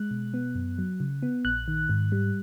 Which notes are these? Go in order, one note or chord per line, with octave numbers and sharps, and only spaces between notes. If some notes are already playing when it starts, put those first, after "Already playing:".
Already playing: G#3 F#6
B2
B3
F#2
F#3
C#3
B3
A#1 F#6
D#3
G#2
G3